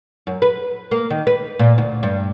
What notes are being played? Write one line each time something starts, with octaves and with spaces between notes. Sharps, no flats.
F#2
B4
A#3
D#3
B4
A#2
D2
G2